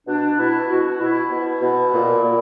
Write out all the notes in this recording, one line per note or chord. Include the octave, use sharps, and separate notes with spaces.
B2 D4
B2 E4
B2 F#4
B2 E4
B2
E4
B2
A#2
A#2